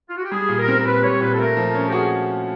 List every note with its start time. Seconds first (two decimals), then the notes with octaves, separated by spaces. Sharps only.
0.09 F4
0.16 F#4
0.24 G4
0.31 G3 G#4
0.49 A#2
0.58 A#4
0.68 C4
0.79 A#4
0.85 A#2 B4
1.03 G3 C#5
1.21 A#2 B4
1.34 A4
1.39 A3 A#4
1.57 F3
1.74 C#4
1.89 G4
1.92 F#4 G#4